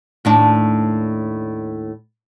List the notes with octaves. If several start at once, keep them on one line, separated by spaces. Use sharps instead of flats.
D#2 A2 D4